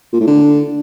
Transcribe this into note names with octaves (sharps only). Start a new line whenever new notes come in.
A#2
A2
D3